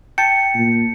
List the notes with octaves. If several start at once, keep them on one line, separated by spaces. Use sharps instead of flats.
G5 A5 C#7
A#2